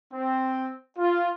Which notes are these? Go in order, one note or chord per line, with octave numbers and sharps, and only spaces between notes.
C4
F4